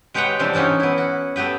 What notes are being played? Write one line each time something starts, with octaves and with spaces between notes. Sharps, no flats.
G#3 G4 B4 C#5 F#5 G5
C3 E3 F3 G3 C4 D4
A2 E3 C#4 D#4 F#4
B3 E4
F#4
A3 B3 G4 B4